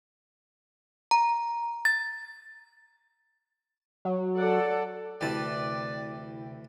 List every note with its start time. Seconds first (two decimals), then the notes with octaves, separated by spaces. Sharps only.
1.11 A#5
1.85 A6
4.05 F#3
4.37 A4 D5 F#5
5.21 D2 C3 E3 E4 B4 D5 G5 A5